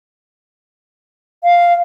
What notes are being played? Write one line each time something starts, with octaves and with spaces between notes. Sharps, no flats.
F5